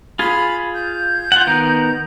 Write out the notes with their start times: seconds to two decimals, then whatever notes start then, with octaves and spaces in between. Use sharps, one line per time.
0.19 F4 G#4 B5
0.74 G6
1.32 F4 F#5
1.47 D#3 B3 A#4